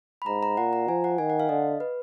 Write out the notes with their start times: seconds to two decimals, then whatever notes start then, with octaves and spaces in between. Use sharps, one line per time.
0.22 B5
0.26 G#2 A#5
0.43 A#5
0.57 A#2 F#5
0.73 A#5
0.88 F3 G#5
1.04 F#5
1.18 D#3 G#5
1.30 F#5
1.40 F5
1.49 D3 D#5
1.80 B4